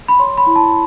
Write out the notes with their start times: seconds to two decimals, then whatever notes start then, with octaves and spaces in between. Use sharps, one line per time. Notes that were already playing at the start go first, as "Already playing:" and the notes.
0.08 B5
0.19 C#5 C6
0.38 B5
0.47 E4
0.56 A5